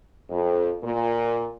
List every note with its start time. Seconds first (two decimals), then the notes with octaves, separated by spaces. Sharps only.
0.30 F2
0.84 A#2